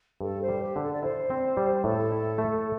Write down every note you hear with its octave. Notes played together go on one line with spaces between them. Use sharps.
G2 A4
C5
G3
G4
D3
A4
D5
E4 C5
C4
G3
A2 A4
E4
A3